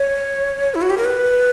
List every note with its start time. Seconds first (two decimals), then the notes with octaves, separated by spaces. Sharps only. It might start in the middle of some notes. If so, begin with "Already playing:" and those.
Already playing: C#5
0.75 E4
0.82 F#4
0.90 G4
0.98 A#4
1.05 B4